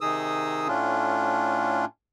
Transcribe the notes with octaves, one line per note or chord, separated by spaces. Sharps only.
C3 D#3 D#4 G#4 D#6 E6
A2 A3 C#4 D4 F4